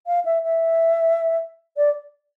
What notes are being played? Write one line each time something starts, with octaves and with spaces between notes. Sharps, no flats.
F5
E5
E5
D5